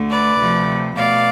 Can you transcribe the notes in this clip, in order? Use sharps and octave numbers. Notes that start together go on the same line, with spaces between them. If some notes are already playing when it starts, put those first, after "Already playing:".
Already playing: D2 D3 A3
B4 D5
D2 C3 F3 A3
B2 A3 D5 F5